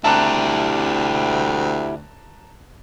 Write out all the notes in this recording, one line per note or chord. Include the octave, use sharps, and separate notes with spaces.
D2 E4 G4 A5 A#5 F#6